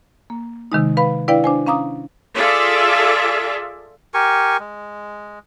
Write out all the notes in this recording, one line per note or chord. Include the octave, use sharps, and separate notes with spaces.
A#3
C3 D#3 G#3 D#4
B4 F5 B5
D4 E4 B4 D5 F5 G5
D4 C5 G#5
C#4 F5 A#5 D6 D#6
F4 G#4 A4 D5 E5
G4 A#4 G#5 C#6
G#3